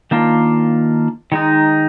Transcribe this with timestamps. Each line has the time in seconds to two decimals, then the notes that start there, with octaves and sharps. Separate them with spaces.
0.11 D#3 A#3 D4 F4
1.32 D#3 G#3 D#4